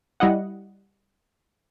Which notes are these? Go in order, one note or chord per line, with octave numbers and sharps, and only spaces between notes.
G3 E4 D#5 F#5